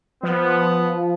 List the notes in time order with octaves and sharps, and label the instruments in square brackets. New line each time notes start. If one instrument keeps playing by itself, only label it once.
[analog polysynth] F3 [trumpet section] B3